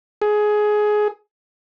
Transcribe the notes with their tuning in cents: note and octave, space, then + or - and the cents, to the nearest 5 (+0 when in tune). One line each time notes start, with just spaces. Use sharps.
G#4 +15